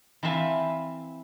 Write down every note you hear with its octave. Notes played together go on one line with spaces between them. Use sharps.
E3 C4 B4 E5 F5 A5